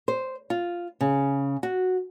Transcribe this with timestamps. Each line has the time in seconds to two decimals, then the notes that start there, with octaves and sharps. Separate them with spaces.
0.08 C5
0.50 F4
1.01 C#3
1.63 F#4